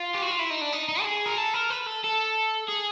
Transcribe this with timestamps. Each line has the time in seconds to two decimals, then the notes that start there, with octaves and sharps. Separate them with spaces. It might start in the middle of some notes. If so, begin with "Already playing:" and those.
Already playing: F4
0.14 G4
0.22 F#4
0.31 F4
0.39 E4
0.50 D#4
0.61 D4
0.72 D#4
0.88 D#4
1.00 A4
1.05 G#4
1.26 A#4
1.38 A4
1.54 A#4
1.70 B4
1.87 A4
2.04 A4
2.68 G#4